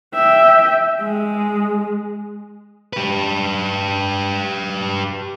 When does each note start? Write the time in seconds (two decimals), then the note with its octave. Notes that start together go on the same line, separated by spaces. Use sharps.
0.14 E5 G5
1.01 G#3
2.93 G4 B4